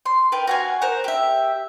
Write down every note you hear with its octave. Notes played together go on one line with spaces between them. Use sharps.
C6
G4 A#4 B4
F#4 F5 G#5
A#4 C5 F#5
G4 E5